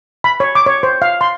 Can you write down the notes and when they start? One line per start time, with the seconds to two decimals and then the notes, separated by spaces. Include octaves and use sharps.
0.24 B5
0.40 C#5
0.55 D6
0.67 C#5
0.83 C5
1.02 F5
1.21 C6